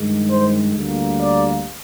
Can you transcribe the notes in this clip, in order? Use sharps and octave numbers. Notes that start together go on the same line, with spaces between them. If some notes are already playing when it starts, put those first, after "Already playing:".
Already playing: G2 D#3 G#3
C5
D2 D3 G3 A#3
D5